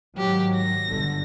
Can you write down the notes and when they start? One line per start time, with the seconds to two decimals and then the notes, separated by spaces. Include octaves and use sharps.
0.17 G#2 D#3 F#3 G4
0.56 A#6
0.88 G1 B2 D3